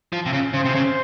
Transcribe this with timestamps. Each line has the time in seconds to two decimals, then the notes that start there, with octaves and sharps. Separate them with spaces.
0.13 F3
0.26 C3
0.33 C#3
0.54 C#3 C5
0.65 C3
0.75 C#3